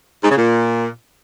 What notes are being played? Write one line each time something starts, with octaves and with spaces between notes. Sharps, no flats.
G#2
C#3
A#2